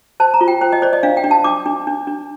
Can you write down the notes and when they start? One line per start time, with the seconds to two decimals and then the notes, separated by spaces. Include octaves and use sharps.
0.20 C5 A5
0.34 A#5
0.41 F4
0.48 G5
0.61 C5 G5
0.73 D#5
0.82 C5 D5
0.93 D#5
1.03 D4 F5
1.17 G5
1.24 D4
1.31 A5
1.44 D4 D6
1.66 D4
1.87 D4
2.07 D4